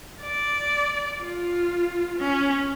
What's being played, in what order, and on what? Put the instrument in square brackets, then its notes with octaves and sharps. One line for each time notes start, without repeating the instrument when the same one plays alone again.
[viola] D5
F4
C#4